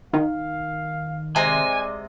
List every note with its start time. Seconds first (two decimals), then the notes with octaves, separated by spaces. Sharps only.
0.13 D#3 F5
1.36 C3 G#3 D5 D#5 G#5